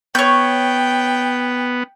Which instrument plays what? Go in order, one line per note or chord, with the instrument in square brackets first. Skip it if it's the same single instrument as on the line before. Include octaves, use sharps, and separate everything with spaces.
[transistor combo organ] B3 [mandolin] C#5 G6 [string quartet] G5